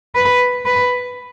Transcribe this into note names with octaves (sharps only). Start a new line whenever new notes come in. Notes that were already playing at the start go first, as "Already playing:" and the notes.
B4
B4